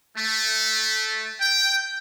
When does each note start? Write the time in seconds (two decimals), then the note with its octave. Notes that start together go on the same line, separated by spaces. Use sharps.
0.18 A3
1.40 G5